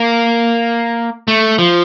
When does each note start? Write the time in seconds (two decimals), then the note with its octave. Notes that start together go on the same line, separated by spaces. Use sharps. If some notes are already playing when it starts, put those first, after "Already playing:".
Already playing: A#3
1.28 A3
1.58 F3